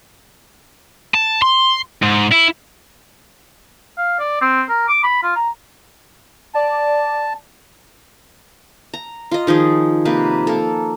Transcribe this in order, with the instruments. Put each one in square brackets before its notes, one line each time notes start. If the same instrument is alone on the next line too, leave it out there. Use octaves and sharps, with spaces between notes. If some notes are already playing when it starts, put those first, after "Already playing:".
[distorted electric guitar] A5
C6
G#2
E4
[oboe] F5
D5
C4
A#4
D6
B5
F4
A#5
[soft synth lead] D5 [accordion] A5
[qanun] A#5
F4 D#5
D#3 F3 D#4 G#4
C3 A#3 B4
A#3 A4